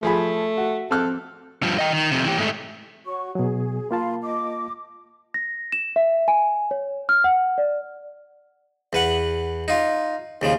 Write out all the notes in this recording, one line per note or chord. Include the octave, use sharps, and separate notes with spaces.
F3 A3 G#4 B5
F#4
C4 A4 F6 F#6
G2 F3
D#5 G5
D#3
F2 C3
E3 G4
G#2 A3
F#4 C#5 C#6
B2 F#3 G#4
A#3 F4 F5 A5 B5 C6
D#5 D6
A#6
E7
E5
G#5
C#5
F6
F#5
D5
E2 B4 F#5
D#4 F4
D#2 C#3 F3